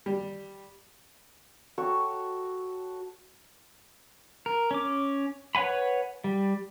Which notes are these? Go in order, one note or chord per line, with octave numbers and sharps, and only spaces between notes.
G3
F#4 A4 C#5 G5
A#4
C#4 D6
B4 C#5 F#5 G#5 B5
G3